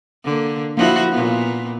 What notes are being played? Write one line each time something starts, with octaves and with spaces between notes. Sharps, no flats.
D3 A#3
F3 A#3 D4 E4 F#4
A#2 B3 F4